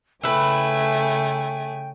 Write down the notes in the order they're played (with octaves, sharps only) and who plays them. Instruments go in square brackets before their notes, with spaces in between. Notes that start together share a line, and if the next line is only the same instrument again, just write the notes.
[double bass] C#3 [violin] A3 G#5 [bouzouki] E4 B4 [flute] G5